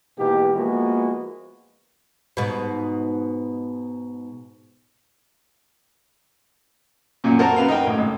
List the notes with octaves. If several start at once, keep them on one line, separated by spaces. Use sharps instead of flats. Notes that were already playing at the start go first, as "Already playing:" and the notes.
G#2 B2 E3 A#3 G4
F3 G#3 A#3 B3 E4 F#4
G#2 B2
F#2 A#2
A#3 F#4 A#4 C5 A5 A#5
F#2 B4 F5
D#4 F#4 A#4 G5
A1
G#1